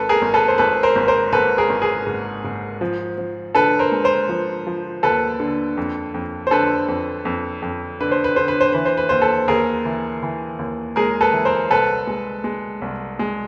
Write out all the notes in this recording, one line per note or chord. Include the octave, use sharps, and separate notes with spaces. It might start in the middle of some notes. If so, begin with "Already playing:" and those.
Already playing: G#1 A4 B4
G#4 A#4
G#1
A4 B4
C5
G#1 A4 B4
A#4 C5
G#1
A#4 C5
G#2 A4 B4
G#4 A#4
G#1
G#4 A#4
G#2
G#2
F3
F3
D3 A4 B4
A#4 C5
G#3
A#4 C5
F3
F3
D#2 A4 B4
D3
F2
F2
C5
D3 A4 B4
F2
F2
F2
D3 B4
C5
B4
D3 C5
B4
C5
E3 B4
C5
B4
D#2 C5
A4 B4
D#2 G#4 A#4
E3
E3
D#2
G#3 G#4 A#4
A4 B4
E3
A#4 C5
C2 A4 B4
G#3
G#3
C2
G#3